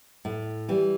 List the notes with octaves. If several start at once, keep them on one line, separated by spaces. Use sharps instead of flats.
A2
E3 G3